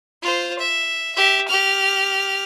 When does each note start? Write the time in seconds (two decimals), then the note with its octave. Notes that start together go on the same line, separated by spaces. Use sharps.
0.23 F4 C5
0.59 E5
1.15 G4 E5
1.48 G4 F6